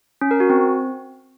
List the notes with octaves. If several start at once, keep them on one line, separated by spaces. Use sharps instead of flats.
C#4
A#4
F#4
C4